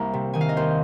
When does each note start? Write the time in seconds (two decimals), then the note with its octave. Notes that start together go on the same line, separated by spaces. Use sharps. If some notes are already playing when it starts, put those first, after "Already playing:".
Already playing: C2 A#3 A#4
0.13 C3
0.33 D#3 G#5
0.41 F5
0.49 D#5
0.56 D#2 C5